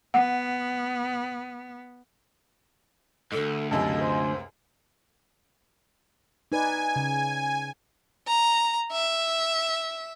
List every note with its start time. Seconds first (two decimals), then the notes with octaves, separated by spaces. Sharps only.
0.14 B3 F#5
3.32 D2 G#2 A4
3.71 C#2 F#2 C3 A4 D#5
4.01 C5
6.52 D#4 B4 D5 G#5
6.96 C#3
8.28 A#5
8.92 E5